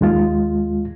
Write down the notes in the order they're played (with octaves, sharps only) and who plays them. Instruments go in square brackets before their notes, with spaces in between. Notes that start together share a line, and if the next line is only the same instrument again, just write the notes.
[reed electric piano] D#2 G#3 F4